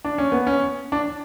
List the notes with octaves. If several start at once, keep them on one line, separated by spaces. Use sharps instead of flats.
D4
C#4
B3
C#4
D4